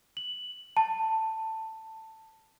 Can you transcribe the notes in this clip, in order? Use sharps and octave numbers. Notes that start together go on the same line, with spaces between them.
F#7
A5